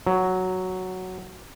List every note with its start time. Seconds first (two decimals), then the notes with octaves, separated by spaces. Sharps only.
0.07 F#3